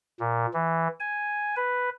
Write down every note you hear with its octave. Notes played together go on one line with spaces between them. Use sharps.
A#2
E3
G#5
B4